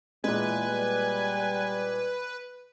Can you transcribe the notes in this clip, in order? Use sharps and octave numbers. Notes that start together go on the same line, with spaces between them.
E2 A#2 G#3 B4 G#5
G3